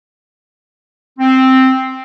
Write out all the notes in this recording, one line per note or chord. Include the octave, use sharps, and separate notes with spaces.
C4